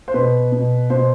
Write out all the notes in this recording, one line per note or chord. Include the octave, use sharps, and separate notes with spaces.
C5
B2 B4
B2
B2 C5